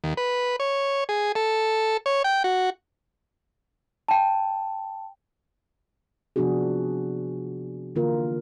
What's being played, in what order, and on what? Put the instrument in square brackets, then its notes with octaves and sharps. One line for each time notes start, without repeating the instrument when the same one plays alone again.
[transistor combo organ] D#2
B4
C#5
G#4
A4
C#5
G5
F#4
[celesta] G5 A5
[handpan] C3 F3 B3 D4 F#4 G#4
D3 E3 A#3 F4 A#4